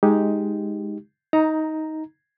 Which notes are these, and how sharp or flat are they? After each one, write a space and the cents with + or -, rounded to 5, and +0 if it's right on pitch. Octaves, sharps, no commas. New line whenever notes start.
G#3 +0 D#4 +10 G4 +0
D#4 +15 A#5 +0